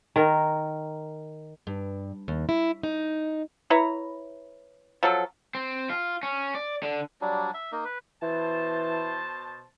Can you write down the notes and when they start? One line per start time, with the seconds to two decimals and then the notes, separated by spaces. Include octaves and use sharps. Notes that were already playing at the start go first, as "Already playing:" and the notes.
0.16 D#3 A#4
1.67 G2
2.28 D#2
2.49 E4
2.83 D#4
3.70 E4 B4 C#5 A#5
5.03 F3 F#3 A4
5.55 C4
5.90 F4
6.23 C#4
6.55 D5
6.83 D3
7.21 F#3 G3 D4
7.54 E5
7.72 A#3 D#4
7.84 B4
8.22 B2 E3 C5 A5